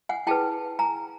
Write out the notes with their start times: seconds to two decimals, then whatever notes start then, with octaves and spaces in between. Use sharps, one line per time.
0.09 F#5 G#5
0.27 E4 G#4 B4 G5 A5
0.79 G#5 A#5